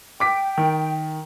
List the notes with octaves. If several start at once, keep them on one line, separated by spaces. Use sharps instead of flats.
G5 D6 B6
D#3